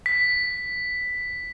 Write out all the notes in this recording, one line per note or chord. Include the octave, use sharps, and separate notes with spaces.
B6